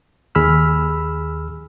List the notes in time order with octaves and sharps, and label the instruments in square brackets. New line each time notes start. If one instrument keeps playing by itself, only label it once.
[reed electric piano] D#2 G#4 B5 E6 F6